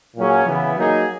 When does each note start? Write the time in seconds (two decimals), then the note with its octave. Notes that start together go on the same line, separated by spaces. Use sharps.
0.16 A#2 F#3 C#4 G#4
0.46 C#3 E3 B3 E4
0.76 F#3 A#3 D#4 G#4